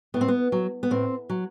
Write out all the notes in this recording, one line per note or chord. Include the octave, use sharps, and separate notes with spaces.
A2 B3
C4
B3
F#3
B3
A2 C4
F#3